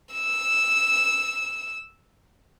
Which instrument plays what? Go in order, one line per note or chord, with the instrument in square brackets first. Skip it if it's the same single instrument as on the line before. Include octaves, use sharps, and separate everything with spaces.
[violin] E6 E7